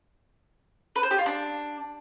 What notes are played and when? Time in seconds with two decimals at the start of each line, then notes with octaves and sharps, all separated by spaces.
0.96 B4
1.03 C5
1.11 G4
1.18 F4
1.26 D4